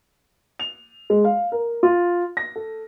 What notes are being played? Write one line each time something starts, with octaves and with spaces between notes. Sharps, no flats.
F7
G#3
F5
A#4
F4
A#6
A4